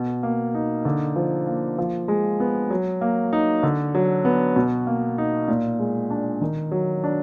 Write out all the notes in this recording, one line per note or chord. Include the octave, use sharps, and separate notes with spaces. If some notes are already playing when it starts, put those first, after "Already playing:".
Already playing: B2
A#3
D#4
D3
F3
A#3
F3
G#3
B3
F#3
A#3
D#4
D3
F#3
B3
B2
A#3
D#4
A#2
G#3
D4
D#3
F#3
D4